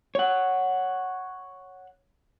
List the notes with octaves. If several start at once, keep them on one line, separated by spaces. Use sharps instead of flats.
C#5 F#5